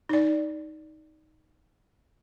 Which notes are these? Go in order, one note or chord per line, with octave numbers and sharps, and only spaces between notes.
D#4 D5